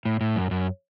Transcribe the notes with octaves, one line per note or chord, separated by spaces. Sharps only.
A2
A2
F#2
F#2